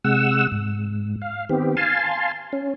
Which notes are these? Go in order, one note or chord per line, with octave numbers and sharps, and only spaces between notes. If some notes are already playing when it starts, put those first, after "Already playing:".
C3 G#3 F#5 E6
G#2
F5
D#3 B3 C4 G4
F5 G#5 A5 C6
C#4